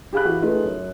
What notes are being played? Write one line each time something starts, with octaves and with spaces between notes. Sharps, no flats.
G4 G#4 F5 B5 F#6
E3 F#4
A3 C#4 D#4 F4 G#4 B4
F#2